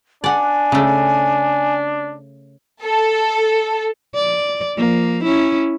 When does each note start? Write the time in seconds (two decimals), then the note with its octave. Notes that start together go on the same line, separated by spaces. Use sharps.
0.24 D4 D5 F#5 G#5
0.72 C#3 A3
2.83 A4
4.15 D5
4.77 F3 A#3
5.24 C#4 E4